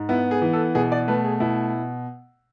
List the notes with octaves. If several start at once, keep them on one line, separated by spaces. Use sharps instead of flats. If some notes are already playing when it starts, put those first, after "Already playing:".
Already playing: G#2
B3 E4
G#4
E3
A4
B2 G#4
D5
A3 B4
G#4
B2 E4